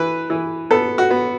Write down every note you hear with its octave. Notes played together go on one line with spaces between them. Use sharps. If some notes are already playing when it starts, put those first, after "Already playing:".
Already playing: E3 B4
E3
B3 A4
F#4
B3